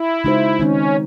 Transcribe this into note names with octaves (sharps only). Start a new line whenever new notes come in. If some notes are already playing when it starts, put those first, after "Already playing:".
Already playing: E4
C#3 G#3 D#4 F#4 C5
D#3 G#3 C4 C#4 D#4